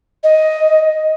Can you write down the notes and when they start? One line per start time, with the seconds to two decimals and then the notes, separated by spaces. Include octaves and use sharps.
0.24 D#5